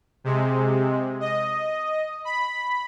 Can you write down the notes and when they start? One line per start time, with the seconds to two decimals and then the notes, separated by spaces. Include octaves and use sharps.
0.24 C3 G#3
1.20 D#5
2.25 B5